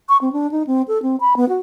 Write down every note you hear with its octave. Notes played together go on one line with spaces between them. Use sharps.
C#6
C4
D4
D#4
C4
A4
C4
B5
B3
F#4